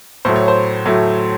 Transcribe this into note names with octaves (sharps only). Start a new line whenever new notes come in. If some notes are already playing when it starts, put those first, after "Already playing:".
A2 F#3 A3 C5
C#5
C5
A2 F#3 A3